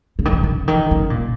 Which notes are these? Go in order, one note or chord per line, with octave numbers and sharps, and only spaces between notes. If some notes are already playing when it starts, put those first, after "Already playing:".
C#3
D#3
C#3
C#3
D#3
C#3
A#2